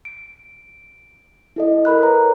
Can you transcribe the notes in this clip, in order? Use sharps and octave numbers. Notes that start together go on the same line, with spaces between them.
D7
E4 A4 D#5
A4 A#4 B5 F#6
B4 C#5 A#5